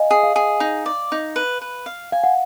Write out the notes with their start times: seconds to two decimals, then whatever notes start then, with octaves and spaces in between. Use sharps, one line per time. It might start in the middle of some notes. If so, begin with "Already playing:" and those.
Already playing: D#5 F5 G#5
0.11 G#4
0.23 F5
0.36 G#4
0.60 D#4
0.86 D5
1.12 D#4
1.36 B4
1.61 B4
1.86 F5
2.12 F5 G#5
2.24 F#5